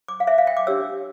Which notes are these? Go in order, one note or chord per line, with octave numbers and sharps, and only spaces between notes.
D6
F5
E5
F5
G5
D6
D4 G4 C#5 E6